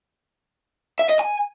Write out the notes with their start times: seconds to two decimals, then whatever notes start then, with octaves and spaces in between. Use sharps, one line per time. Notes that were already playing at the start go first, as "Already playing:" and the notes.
0.99 E5
1.09 D#5
1.19 G#5